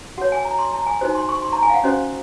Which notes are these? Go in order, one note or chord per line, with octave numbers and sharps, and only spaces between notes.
F#4 C#5 F#5
G#5
A#5
C6
A#5
G#5
D#4 F#4 C5
C6
C#6
C6
A#5
G#5
F5
F#5
C#4 F#4 C5 D#5